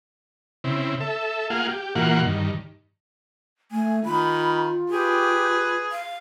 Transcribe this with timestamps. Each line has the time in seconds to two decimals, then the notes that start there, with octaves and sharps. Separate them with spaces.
0.64 C#3 C4 E4
1.00 A4 E5
1.50 A#3 F4 G#4 F5 F#5
1.68 G4
1.95 A#2 E3 A#3 F4 F#4 F#5
2.25 G2 D#3
3.72 A3 G#5
4.05 D#3 F4 B5
4.90 G4 G#4 B4
5.92 F5